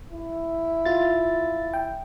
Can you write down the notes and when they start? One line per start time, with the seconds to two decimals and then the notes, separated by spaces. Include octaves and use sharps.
0.12 E4
0.85 F4 A6
1.74 G5